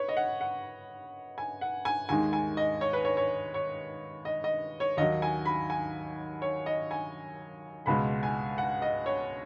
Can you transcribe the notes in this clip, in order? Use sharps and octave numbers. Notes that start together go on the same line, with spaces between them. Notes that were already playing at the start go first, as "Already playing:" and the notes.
Already playing: B4 C#5
D#5
F#5
F#5
G#5
F#5
G#5
D#2 D#3 G#3 G#5
G#5
D#5
C#5
B4
C#5
C#5
C#5
D#5
D#5
C#5
D#2 D#3 F#3 D#5
G#5
B5
G#5
C#5
D#5
G#5
C#2 B2 G#3 B5
G#5
F#5
D#5
C#5